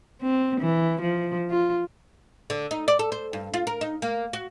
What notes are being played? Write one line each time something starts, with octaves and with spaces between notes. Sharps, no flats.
C4
E3
F3
F4
D3
D#4
D5
A4
C5
G2
F4
A#4
D#4
A#3
F#4